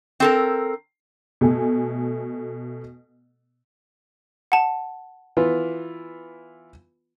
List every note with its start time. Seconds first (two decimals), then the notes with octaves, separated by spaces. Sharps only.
0.20 C4 A4 A#4
1.41 B2 A3 A4 G#5
4.52 F#5 A5
5.37 E3 B3 F4